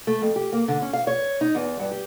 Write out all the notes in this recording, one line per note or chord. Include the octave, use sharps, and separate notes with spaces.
A3
F2
G4
A#3
D3
C#4
F5
C#5
D#4
E2
G2
G4